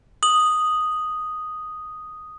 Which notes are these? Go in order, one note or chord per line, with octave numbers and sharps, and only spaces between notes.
D#6 F#7